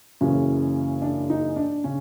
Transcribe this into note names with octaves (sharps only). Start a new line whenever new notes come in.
F#1 F#2 C#3 E3 C#4
D4
D#4
D4
C#3 C#4